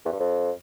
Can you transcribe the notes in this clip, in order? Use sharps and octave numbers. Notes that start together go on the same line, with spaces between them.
E2
G2
F2